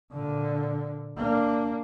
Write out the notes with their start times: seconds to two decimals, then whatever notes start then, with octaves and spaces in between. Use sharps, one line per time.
0.13 A#2 D3
1.17 A#3 D4